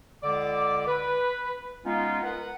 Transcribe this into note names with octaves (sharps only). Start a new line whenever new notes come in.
C#2 D3 D5 D6
B4
G#3 B3 C#4 D#4 F4
A#4 B4 F#5